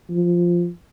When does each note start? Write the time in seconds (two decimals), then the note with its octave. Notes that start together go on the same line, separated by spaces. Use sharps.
0.10 F3